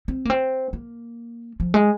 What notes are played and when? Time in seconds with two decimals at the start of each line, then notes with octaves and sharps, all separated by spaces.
0.08 C4
0.25 A#3
0.30 C4
0.73 A#3
1.60 F3
1.74 G#3